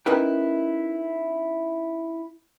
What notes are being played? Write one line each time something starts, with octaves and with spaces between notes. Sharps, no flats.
C#4 D#4 E4 A#4 B4 G5